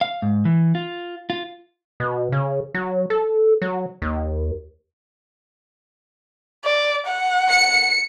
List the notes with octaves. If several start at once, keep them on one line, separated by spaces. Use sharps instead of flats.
F5
G#2
E3
F4
F4
B2
C#3
F#3
A4
F#3
D#2
D5
F#5
C#7